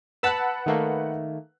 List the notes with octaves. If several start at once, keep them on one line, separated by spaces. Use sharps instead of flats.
B4 F#5 A5 B5 E6 F#6
D#3 A3 A#3